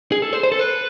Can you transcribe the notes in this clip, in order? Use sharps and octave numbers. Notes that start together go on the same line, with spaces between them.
G#4
A4
C5
C5
A4
B4